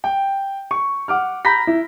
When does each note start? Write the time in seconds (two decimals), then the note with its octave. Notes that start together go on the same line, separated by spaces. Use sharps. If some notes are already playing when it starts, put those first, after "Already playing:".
0.04 G5
0.71 C#6
1.08 F#5 D6 F6
1.45 A#5 B5 G6 A#6 B6
1.67 E4